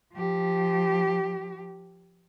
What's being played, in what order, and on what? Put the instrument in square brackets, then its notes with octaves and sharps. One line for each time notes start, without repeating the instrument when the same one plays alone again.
[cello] F3 G4